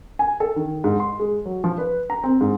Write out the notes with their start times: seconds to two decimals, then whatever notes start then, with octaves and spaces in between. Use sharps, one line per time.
0.19 G#5
0.40 A4
0.56 D#3
0.84 G#2
1.00 C6
1.19 G#3
1.46 F#3
1.64 F3
1.78 B4
2.10 A#5
2.24 C4
2.41 G#2